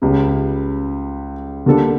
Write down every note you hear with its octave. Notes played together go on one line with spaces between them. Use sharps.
C#2 C#3 G3
D3 G3 A#3 D4 A4